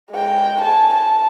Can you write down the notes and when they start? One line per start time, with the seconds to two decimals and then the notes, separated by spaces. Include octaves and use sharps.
0.12 G#3 G5
0.61 G#5 A5
0.94 A5